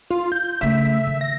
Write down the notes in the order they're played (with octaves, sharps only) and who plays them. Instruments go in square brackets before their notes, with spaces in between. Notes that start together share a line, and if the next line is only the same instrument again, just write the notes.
[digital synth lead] F4
G6
[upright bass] C#3 A3 [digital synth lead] E5
[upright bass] D#3
[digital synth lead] A#6